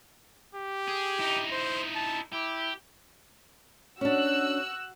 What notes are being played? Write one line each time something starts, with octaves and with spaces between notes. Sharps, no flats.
G4
G#4
D#4 E4
C5
A5
E4 G4
C#4 D4 F#4 E6 F#6